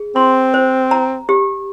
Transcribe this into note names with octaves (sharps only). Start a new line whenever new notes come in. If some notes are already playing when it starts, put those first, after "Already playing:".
Already playing: G#4
C4 C6
C5
A#5
G4